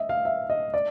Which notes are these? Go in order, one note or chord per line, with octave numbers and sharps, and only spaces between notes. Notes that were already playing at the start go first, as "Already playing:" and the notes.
Already playing: D#5 E5
F5
E5
D#5
D5